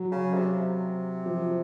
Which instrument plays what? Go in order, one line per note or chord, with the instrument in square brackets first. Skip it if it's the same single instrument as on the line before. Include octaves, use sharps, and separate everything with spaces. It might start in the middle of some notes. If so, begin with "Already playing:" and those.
Already playing: [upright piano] F#3
[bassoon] C#3
C3
[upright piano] F3